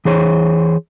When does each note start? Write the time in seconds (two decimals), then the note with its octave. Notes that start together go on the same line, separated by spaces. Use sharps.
0.05 E3 G#4 C5 C#5